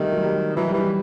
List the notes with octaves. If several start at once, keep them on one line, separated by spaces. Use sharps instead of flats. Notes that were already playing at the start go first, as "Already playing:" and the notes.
Already playing: D#3 G3 A3
F#3
G3
E3 F#3
G3
E3
G3